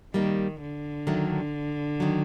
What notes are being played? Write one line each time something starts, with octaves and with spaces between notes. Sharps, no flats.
D#3 G3 A#3 D#4
D3
D#2 D#3 F#3 A3 D4
D#3 F#3